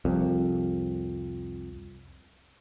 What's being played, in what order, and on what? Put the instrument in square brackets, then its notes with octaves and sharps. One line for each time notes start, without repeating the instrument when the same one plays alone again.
[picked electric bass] C2 F2